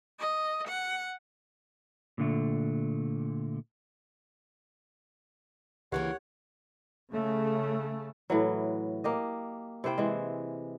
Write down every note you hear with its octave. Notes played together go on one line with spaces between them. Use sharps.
D#5
F#5
A#2 D3 A3
C#2 D3 E3 A#3 G4 C#5 F#5
C#3 A3
A2 E3 F#3
A#3 G4 D#5
C3 E4 C5 G5
E3 G#3